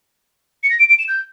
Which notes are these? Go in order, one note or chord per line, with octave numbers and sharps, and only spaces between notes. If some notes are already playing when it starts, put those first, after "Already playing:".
C#7
A#6
D7
D7
E7
G6